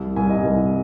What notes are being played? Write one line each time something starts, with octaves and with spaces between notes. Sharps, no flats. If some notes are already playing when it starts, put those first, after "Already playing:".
Already playing: C2
C2 G#5
D#5
C2